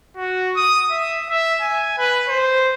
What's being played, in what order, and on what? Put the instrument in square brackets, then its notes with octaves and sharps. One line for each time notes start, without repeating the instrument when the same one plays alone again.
[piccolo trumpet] F#4
D#6
E5
E5
G#5
B4
C5